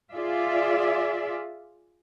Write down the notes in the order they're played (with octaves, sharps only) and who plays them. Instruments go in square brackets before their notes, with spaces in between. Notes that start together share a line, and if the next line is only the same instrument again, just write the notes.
[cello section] F4 G#4 D5 E5